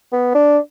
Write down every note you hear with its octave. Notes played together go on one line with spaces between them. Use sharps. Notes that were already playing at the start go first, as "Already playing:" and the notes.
B3
D4